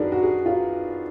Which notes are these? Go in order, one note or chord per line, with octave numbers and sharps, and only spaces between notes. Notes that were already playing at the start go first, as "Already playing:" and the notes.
Already playing: F#2 D#3 D4 D#4 F#4 G#4 A#4 B4
F#4
G#4
F4